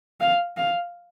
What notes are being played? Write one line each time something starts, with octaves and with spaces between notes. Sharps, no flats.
F5
F5